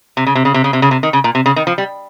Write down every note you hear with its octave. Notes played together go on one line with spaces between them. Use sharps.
C3
C#3
C3
C#3
C3
C#3
C3
C#3
C3
D#3
C#3
A#2
C3
C#3
D#3
F3
G3